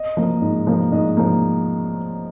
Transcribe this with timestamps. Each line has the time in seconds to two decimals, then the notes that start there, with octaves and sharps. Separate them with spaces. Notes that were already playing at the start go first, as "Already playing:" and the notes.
Already playing: D#5
0.17 F3 A#3
0.42 G#2
0.67 F3 A#3
0.92 G#2 D#5
1.17 F3 A#3